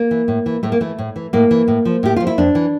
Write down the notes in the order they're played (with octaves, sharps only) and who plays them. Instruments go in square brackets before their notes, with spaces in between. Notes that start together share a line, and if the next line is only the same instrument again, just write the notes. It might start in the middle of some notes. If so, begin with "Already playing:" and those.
Already playing: [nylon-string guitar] A#3
E3
A2
E3
A2 A3
A#3
E3 A3
A2
E3
A2 A#3
E3
A2
F3
A2 G4
F3 F4
E4
F2 D4
E3